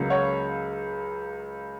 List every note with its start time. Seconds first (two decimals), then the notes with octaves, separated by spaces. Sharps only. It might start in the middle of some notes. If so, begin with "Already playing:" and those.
Already playing: C#2 C#3 F#3 A#3
0.10 C#5 F#5